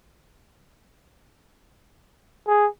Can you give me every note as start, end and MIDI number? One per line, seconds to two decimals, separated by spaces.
2.48 2.67 68